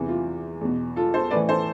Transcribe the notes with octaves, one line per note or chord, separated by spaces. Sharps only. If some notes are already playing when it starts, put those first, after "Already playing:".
Already playing: E2 C3 E3
F4
E2 B2
F4 A4
A4 C5
A2 E3 B4 D5
A4 C5